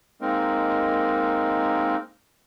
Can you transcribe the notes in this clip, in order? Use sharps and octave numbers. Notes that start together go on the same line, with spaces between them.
G#3 A#3 C4 D#4 A#4